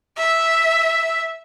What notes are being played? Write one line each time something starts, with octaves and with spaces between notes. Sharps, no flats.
E5